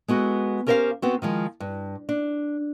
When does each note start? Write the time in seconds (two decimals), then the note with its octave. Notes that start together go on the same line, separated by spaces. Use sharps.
0.08 G#3 B3 F#4 A4
0.67 C#4 G4 A#4 C5 C#5 F5
1.02 B3 C4 F#4
1.22 D#3 F3 G#3
1.60 G2
2.09 D4